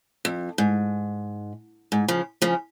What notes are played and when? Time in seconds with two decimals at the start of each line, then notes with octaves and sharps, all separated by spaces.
0.25 F2
0.58 G#2
1.92 G#2
2.08 C#3 F3
2.42 C#3 F3